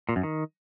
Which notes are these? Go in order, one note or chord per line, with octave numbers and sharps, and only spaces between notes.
A#2
F#2
D#3